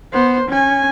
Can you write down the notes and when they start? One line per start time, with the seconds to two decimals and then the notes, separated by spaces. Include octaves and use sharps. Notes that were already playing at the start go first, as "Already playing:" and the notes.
0.13 B3 C5
0.48 C#4 G#5